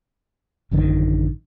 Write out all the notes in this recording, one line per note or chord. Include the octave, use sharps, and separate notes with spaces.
A1 F#2 D3 D#3